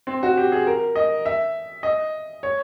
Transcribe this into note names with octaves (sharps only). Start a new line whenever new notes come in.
C4
F#4
G4
G#4
A#4
D#5
E5
D#5
C#5